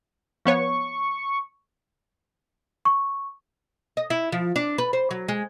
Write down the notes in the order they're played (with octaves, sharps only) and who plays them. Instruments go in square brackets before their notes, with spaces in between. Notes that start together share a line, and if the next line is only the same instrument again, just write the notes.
[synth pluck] F3 B3 C#5 [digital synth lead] C#6
[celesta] C#6
[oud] D#5
E4
F3
D4
B4
C5
F#3
G#3